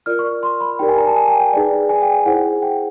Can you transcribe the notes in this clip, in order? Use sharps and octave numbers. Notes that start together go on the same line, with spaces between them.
F4 A#4 D5 F6
C#6
C6
B5
D#4 G4 A#4 D5 G5
G#5
A#5
A5
G#5
G5
G5
D#4 G#4 B4 D5
G#5
G5
G#5
E4 G#4 C5 F#5
G5